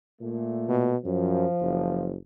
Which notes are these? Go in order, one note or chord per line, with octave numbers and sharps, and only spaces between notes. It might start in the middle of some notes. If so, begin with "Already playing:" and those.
A#2 A3
B2
F#2 F3
F#1